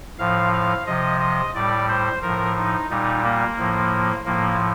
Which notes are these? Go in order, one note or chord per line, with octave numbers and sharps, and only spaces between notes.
A2 F3 F5
F5
C3 F3 D#5
D#5
A2 G3 D5
C5
A2 F3 A#4
D#4
A#2 G3 D#4
A#3
A2 F3
A2 F3 A#3